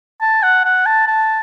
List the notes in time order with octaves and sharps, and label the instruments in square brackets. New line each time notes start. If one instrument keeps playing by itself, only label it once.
[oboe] A5
F#5
F#5
A5
A5